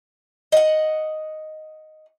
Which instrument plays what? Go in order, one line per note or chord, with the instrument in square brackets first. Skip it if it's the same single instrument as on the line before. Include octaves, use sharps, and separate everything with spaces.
[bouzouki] D#5 F#5